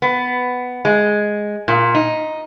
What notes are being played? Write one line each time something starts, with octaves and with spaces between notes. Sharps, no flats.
B3
G#3
A#2
D#4